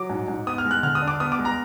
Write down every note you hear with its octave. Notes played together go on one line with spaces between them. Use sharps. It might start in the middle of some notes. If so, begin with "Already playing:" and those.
Already playing: F#3 D6
G#2
G#2
B3 D#6
F6
G#3
F#6
D3 F6
D#6
D4
D6
B3 D#6
D6
G#3
A#5